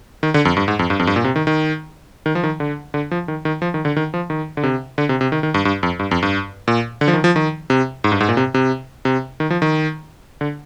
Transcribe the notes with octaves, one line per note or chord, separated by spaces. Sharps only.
D#3
D3
F2
G2
G#2
F2
G2
F2
G2
A#2
C3
D#3
D#3
D#3
F3
D#3
D3
D3
F3
D#3
D#3
F3
D#3
D3
D#3
F3
D#3
D3
C3
D3
C3
C3
D#3
D#3
G2
G2
F2
G2
F2
G2
A#2
D3
F3
D#3
F3
D#3
C3
G#2
G2
G#2
A#2
C3
C3
C3
D#3
F3
D#3
D3